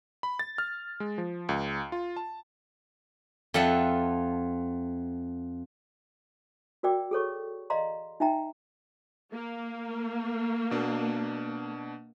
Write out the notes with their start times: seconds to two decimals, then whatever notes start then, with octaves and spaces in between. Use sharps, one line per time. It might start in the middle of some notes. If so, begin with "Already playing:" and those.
0.23 B5
0.39 A6
0.58 F6
1.00 G#3
1.18 F3
1.49 C#2
1.92 F4
2.16 A5
3.54 F2 F4 E5 F#5 A5
6.83 F#4 A#4 D5 G5 D6
7.11 G#4 A4 C#5 C#6
7.70 D5 D#5 F5 A#5 C6
8.20 D#4 E5 G5 A#5
9.33 A#3
10.71 B2 D4